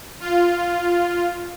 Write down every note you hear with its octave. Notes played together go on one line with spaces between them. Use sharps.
F4